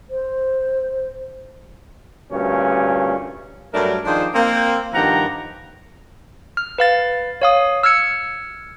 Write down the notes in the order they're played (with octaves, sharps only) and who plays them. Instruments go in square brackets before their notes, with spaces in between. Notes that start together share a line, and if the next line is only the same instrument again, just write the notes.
[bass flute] C5
[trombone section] D2 G2 A#2 C#4
[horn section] G2 F#3 A3 D4 A#4
D#3 F3 D4 G#4 C5
A#3 C4
G2 D#3 F3 G4 F#5 A#5
[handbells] F6
B4 F5 A6
C#5 F5 D#6
E6 F6 G#6 C#7